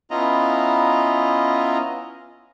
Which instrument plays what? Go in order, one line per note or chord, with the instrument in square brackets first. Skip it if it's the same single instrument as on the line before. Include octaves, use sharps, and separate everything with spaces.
[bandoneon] B3 C#4 E4 F4 D#5 A#5